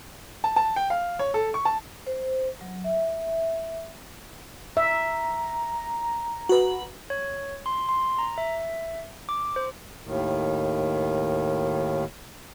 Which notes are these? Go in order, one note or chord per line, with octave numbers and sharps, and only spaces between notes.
A5
A5
G5
F5
C#5
A4
C#6
A5
C5
F#3
E5
E5 A#5
F#4 B4
C#5
C6
C6
A#5
E5
D6
C5
D#2 A2 D#3